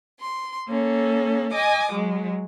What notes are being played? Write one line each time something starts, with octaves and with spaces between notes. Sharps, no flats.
C6
A#3 C#4 A4
D#5 G#5 D6 D#6
F#3 G#3